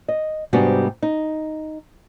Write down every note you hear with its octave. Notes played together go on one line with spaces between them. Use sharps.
D#5
G#2 C3 G3 B3 D4 F#4
D#4